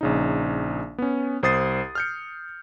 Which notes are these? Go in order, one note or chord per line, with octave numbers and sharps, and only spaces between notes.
A#1 C#3 D#4
B3 C#4
C2 C5 D#6 A6 C7
F6 G6 C#7